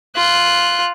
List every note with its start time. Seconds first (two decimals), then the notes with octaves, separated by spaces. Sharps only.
0.16 F4 F#6